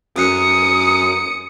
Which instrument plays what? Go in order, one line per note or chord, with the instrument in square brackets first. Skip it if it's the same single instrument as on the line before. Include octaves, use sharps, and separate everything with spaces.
[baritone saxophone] F#2 [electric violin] D#6 C#7